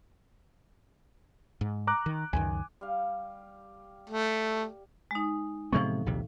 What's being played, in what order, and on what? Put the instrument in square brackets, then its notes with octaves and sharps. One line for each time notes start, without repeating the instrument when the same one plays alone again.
[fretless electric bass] G#2
[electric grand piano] A#5 D6 F#6
[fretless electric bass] D#3
[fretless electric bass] C#2 F#2 D#3 [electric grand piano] G#5
[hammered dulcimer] G3 F5
[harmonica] A3
[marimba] G#3 D#4
[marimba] A2 E3 F3 [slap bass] C3 G#3 B3
[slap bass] A#1 D#2 C3